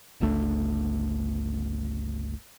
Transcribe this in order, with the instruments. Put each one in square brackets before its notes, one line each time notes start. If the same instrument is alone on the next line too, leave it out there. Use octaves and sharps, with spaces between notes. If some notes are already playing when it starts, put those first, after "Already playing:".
[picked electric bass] G1 C#2 A3 D4